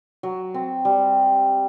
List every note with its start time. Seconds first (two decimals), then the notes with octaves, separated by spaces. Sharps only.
0.23 F#3
0.54 C4
0.85 G3